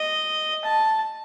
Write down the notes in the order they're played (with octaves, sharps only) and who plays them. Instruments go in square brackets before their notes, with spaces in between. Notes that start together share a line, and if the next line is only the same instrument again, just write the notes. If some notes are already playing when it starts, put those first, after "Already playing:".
Already playing: [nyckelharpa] D#5
A5